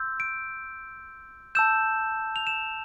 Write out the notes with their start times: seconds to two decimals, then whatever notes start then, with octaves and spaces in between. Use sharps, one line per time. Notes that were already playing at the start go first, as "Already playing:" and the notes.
Already playing: C6 E6 G6
0.20 D7
1.55 A5 E6 G6 E7
2.36 F7
2.47 E7